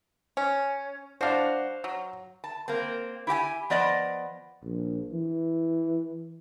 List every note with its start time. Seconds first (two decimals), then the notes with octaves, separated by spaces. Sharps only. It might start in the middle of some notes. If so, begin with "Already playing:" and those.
0.37 C#4
1.21 G3 D4 F#4 C5 F5
1.84 F#3
2.44 A5
2.68 A#3 C4
3.27 E4 G4 G5 G#5
3.70 F3 B3 D5 D#5 A5
4.64 A#1
5.12 E3